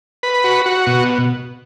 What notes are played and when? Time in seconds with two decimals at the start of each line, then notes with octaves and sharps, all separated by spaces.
0.23 B4
0.44 F#4
0.66 F#4
0.87 B2